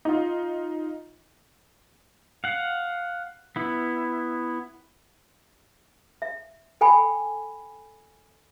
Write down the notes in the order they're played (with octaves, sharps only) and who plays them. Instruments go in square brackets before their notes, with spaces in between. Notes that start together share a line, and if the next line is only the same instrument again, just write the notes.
[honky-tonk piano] D#4 F4
[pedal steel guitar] F5 F#5
B3 E4
[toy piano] E5
A4 G5 G#5 B5